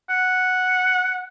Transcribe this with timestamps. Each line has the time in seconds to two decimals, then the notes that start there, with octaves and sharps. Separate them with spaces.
0.10 F#5